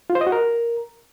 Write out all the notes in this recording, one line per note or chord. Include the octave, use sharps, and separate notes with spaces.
F4
C5
D#5
F#4
A#4